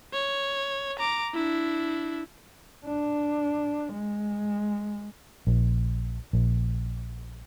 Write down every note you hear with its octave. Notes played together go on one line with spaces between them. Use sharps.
C#5
A#5 D6
D4 E4
D4
G#3
A#1
A#1